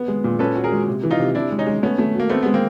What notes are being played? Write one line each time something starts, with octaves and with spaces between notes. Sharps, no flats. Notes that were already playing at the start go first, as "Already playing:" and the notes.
Already playing: B3
G#3
A#2
C#4 A4 B4
F#4
G#4 A#4
G#3
C3
E3
D#4 F4
C3
C3 D4 E4
G#3
C#4 D#4
G#3
A3 B3 C#4
A3
F#3 A#3
A3 B3 C4
G#3 B3
A#3 C4